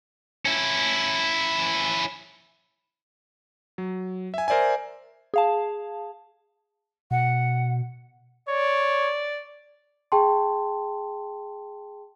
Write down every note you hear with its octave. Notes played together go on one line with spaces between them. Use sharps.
C#4 E4
F#3
E5 G#5
A#4 C5 D5 E5 G#5
G#4 F5 A5
B2 F#5
C#5 D5
G#4 G5 A5 C6